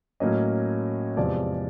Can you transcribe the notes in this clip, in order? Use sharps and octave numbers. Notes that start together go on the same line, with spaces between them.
A2 F#3 A#3 C#4 D#5
E2 C3 F3 G#3 D5